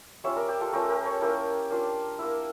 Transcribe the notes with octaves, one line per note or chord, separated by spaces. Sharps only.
G3 C#4 F4 C#5 E5
A#4 D5
G4
F4 A4
A3 C#4 F4 G4 A#4
G4 A#4
A4 C#5
A#3 C#4 E4 G4 A#4
A#3 D4 F4
A#3 E4